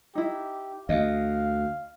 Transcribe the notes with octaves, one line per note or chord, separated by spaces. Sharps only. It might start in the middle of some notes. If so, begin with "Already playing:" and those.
D#4 E4 G4
D2 D#5 F5